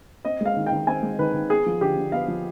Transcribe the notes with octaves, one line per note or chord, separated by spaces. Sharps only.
C4 D#5
G#3 F5
D#3
G5
D#3
C4 G#5
G#3
D#3 B4
D#3
B3 G#4
F3
D3 G4
D3
B3 F5
F3